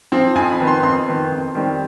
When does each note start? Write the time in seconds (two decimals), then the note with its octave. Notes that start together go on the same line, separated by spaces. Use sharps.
0.12 F3 C4
0.35 F2 G#5
0.52 B5
0.60 D#3 B3
0.67 C6
0.83 F2 C6
1.08 D#3 B3
1.32 F2
1.55 D#3 G3 C4